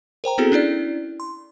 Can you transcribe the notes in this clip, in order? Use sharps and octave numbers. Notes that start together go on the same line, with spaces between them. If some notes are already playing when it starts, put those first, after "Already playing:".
A#4 C5 G5 A#5
B3 C4 E4 F#4 G#4 A4
C#4 D4 E4 D5
C6